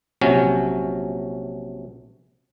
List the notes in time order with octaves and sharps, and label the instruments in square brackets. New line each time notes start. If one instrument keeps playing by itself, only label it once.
[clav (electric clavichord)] A#1 C3 F#3 C#4